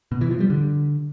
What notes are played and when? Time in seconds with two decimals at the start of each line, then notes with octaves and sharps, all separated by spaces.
0.12 B2
0.21 E3
0.31 F3
0.40 G3
0.50 D3